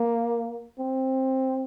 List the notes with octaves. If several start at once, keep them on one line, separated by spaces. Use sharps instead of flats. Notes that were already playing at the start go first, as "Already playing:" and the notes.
Already playing: A#3
C4